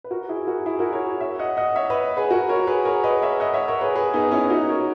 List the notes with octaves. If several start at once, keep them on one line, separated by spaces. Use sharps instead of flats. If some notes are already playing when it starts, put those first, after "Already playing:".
B4
F#4 A#4
E4 G#4
F#4 A#4
E4 G#4
F#4 A#4
A#4 C#5
C#5 E5
D#5 F#5
D#5 F#5
C#5 E5
B4 D#5
G#4 B4
F#4 A#4
A#4 C#5
G#4 B4
A#4 C#5
B4 D#5
C#5 E5
D#5 F#5
C#5 E5
A#4 C#5
G#4 B4
G#4 B4
B3 D#4
C#4 E4
D#4 F#4
A#4 C#5